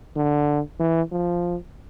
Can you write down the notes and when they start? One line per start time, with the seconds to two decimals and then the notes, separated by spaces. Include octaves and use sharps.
0.16 D3
0.79 E3
1.12 F3